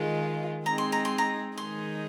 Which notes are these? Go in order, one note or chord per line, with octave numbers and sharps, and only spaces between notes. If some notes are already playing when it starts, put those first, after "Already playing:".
Already playing: D#3 G#3 F4
G#3 C4 D#4 G#4 A#5
C6
A#5
C6
A#5
D#3 G#3 D#4 G#4 C6